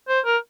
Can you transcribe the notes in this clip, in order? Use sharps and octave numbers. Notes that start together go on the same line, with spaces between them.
C5
A#4